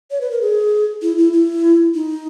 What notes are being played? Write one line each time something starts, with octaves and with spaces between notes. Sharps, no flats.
C#5
B4
A#4
G#4
E4
E4
E4
D#4